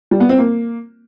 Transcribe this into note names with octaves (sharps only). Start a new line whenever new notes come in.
G3
B3
C4
A#3